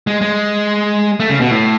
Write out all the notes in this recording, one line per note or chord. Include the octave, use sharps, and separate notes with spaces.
G#3
G#3
A3
C#3
B2
A2